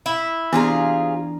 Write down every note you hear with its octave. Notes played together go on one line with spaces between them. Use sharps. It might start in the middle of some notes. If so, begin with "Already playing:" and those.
E4
C3 E3 B3 D4 F4 G#4 A#5